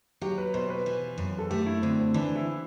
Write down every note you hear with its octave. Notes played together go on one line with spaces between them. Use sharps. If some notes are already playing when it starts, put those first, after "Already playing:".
F#3 G4
B4
B2 C5
B4
E3
F#2
A4
A3 G4
E4
D3 C4
C4
E3 D4
E4